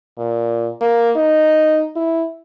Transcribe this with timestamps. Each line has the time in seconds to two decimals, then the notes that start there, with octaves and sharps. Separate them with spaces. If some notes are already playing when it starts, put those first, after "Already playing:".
0.19 A#2
0.81 A#3
1.16 D#4
1.96 E4